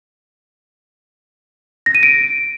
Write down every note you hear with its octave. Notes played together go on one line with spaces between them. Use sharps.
A#6
D#7
D7